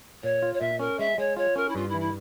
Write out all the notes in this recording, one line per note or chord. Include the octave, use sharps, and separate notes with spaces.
A#2 C#5
F4
C#5
A#2 E5
C#4 A#4
G#3 E5
G#3 C#5
F4 C#5
C#4 A#4
E4
G2 F4
E4
E3
E4